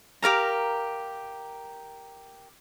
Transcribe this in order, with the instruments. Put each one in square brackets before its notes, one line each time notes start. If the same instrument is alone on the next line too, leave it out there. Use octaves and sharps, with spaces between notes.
[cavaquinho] G4 A#4 F5 A#5